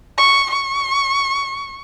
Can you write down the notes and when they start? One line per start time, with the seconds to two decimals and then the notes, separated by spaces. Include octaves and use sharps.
0.18 C#6
0.51 C#6